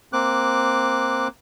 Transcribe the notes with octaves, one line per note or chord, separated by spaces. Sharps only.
A#3 C4 D6 F#6